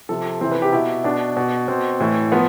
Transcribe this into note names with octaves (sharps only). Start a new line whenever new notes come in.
C3 F3 A4
C3 E3 C4
B4
G4
B2 E4
B2 D4
B2
B2 C4
A2 E3
F3 B3